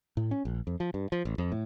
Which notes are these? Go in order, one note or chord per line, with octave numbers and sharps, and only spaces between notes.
A2
C#4
A#1
F2
F3
G2
F3
A1
F2
A2